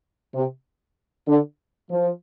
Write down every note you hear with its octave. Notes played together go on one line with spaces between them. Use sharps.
C3
D3
F3